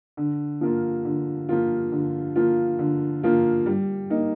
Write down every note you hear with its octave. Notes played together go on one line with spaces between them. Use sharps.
D3
F3 A#3 F4
D3
F3 A#3 F4
D3
F3 A#3 F4
D3
F3 A#3 F4
G3
A#3 D#4